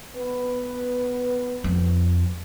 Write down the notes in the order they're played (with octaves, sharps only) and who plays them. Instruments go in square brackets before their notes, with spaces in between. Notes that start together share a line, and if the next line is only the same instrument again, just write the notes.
[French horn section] B3 B4
[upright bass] F2